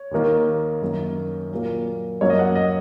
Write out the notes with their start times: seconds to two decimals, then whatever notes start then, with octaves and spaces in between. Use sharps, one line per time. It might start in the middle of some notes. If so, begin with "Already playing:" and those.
Already playing: C#5
0.11 D#2 D#3 A#3
0.82 F#2 D#3 A#3
1.51 A#2 F#3 A#3
2.21 F#2 F#3 A#3 C#5
2.30 D#5
2.39 F#5
2.55 D#5